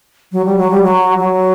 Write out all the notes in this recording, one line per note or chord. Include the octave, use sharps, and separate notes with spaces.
F#3
G3
F#3
G3
F#3
F#3